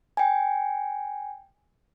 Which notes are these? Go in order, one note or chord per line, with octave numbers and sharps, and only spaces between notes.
G5 G#5